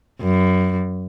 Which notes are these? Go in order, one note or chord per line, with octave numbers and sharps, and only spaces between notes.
F#2